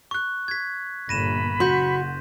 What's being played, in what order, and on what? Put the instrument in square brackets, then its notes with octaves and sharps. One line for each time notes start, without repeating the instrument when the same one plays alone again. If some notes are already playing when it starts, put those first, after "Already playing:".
[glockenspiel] C#6 F#6
G#6 B6
[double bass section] G1 A#2 A#3 [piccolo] B5 [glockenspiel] A#6 D#7 E7
[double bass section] F#1 [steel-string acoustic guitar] F#4 [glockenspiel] C6 G6 B6